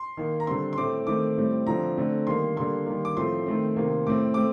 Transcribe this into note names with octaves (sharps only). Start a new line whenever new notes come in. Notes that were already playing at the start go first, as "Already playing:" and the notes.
Already playing: C6
D#3 A#3
A#5
D3 G3 C4 C6
C6
A2 A3 C4 D6
D#3 A3 C4 D6
A2 G3 C4
D3 F3 C4 A#5
D3 A3 C4
D#3 G3 A#3 C6
D3 G3 A#3 C6
D#3 G3 A#3
D6
A2 F3 A3 C4 C6
D#3 A3 C4
C3 D#3 A#3
A2 A3 C4 D6
A3 C4 D6